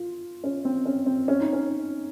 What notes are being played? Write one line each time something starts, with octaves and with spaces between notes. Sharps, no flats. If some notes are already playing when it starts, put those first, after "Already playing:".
Already playing: F4
C#4
C4
C#4
C4
C#4
D#4
C#4